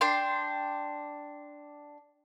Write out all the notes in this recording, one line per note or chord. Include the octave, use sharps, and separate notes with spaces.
D4 G5 C6